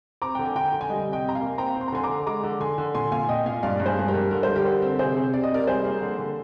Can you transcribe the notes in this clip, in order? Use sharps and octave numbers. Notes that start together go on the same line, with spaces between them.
C4 A#5 D6
D3 G5
G#5
D3 G5 A#5
D3
G#5
G3 D#5 G5
C3
D#5 G5
C3 A#5
F5 G#5
A#3
C4 G5 A#5
C4
C6
A#5
D3 G#5 C6
A#5 D6
D3
G#3 A#5 D6
D3
D3 G#5 C6
D3
A#2 G#5 C6
A#2 F5 G#5
A#2 D#5 G5
A#2 F5 G#5
G2 D5 F5
G2
G#4 C5
G2 G#4
G4 A#4
G2
D3 A#4
G3 C5
G4 A#4
D3
C4
C3 G#4 C5
C3
C3 D5
D#5
C3 A#4 D5
G3 G#4 C5
A#3
D3
D3